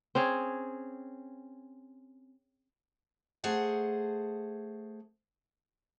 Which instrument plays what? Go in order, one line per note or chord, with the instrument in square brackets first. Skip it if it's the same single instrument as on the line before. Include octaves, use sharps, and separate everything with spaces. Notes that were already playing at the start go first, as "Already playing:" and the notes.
[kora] C4 C#4 G#4
[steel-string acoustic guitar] A3 G#4 C5 F#5